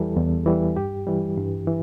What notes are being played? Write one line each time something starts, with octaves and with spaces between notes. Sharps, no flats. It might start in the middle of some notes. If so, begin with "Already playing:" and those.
Already playing: E2 E3 G3 A4
E2
E3 G3
G2 G4
E3 G3
G2
E3